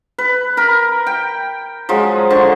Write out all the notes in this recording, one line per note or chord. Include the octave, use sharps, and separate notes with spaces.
B4
A#4 B5
G5
F3 F#3 G#3
D3 C5 C#6